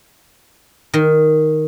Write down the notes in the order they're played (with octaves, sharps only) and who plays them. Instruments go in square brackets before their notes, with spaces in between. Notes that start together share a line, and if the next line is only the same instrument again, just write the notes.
[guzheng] D#3